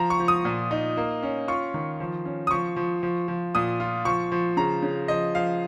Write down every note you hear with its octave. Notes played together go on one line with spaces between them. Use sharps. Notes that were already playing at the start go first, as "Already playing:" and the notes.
Already playing: F3 A#5
C#6
F3
D#6
A#2
D#4
A#3
C#4
F4 C#6
D#3
F3
C#4
D#6
F3 C#6
F3
F3
F3
A#2 D#6
F4
F3 C#6
F3
C#3 A#5
C#3
F3 D#5
F3 F5